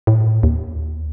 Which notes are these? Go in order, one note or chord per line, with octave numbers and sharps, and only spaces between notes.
A2
D#2